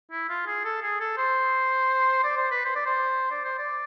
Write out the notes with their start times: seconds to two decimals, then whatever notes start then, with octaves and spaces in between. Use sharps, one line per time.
0.11 E4
0.29 F4
0.46 G#4
0.64 A4
0.82 G#4
1.00 A4
1.17 C5
2.24 D5
2.37 C5
2.51 B4
2.65 C5
2.76 D5
2.86 C5
3.31 D5
3.45 C5
3.59 D5